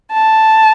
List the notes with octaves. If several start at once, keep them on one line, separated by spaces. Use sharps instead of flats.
A5